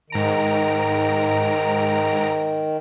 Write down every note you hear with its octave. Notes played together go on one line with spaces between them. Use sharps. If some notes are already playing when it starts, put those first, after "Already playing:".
G#2 D#3 A#5 D7